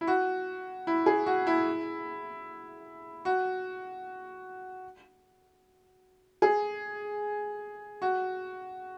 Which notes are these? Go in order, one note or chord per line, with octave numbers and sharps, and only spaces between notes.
E4
F#4
E4
G#4
F#4
E4
F#4
G#4
F#4